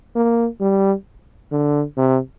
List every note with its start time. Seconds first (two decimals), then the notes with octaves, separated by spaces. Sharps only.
0.15 A#3
0.61 G3
1.52 D3
1.97 C3